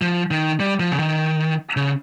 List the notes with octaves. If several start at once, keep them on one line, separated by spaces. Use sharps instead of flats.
F3
D#3
G3
F3
C#3
D#3
C#3